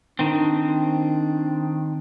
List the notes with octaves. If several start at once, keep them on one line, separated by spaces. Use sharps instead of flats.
D#3 C4 D4